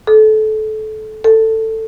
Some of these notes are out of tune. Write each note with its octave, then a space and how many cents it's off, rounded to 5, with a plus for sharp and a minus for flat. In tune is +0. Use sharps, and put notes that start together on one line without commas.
A4 -25
A4 +15